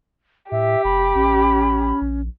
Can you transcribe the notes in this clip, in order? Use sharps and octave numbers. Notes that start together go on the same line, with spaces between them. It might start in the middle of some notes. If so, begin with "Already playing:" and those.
A2 G4 E5
F1 B5
A1 C#4
A#1